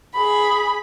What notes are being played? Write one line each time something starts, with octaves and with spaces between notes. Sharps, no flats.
G#4 B5